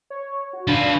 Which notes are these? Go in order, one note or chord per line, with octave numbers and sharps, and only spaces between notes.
C#5
F#4
D4 F4 B4